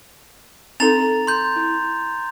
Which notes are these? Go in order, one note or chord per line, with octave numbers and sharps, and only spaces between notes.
C4 D#4 A4 A#5 A6 F7
C6 G6
E4